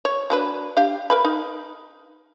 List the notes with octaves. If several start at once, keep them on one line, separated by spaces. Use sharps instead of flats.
C#5
F#3 D4 B4
D4 G4 F5
A#4 B4 B5
D#4